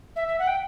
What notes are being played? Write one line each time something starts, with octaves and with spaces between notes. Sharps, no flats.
E5
E5
F#5
G5